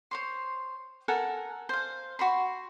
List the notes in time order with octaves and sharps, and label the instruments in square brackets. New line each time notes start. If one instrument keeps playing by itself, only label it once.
[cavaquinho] C5 C#5 C6
A4 A#4 F#5 G#5
C5 F5
F#4 B5 C6